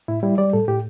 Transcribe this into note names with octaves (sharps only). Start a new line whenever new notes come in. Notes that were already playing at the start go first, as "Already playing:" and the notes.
A2 E4
G3 E4
G3 D5
A2 A4
A2 G4